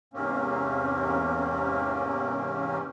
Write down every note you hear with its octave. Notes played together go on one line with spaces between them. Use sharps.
E2 G#2 C3 A#3 C4 C#4